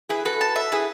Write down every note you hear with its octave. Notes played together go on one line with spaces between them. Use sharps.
E4 G#4 B4
F#4 A4 B4
A5
E5
E4 G#4 B4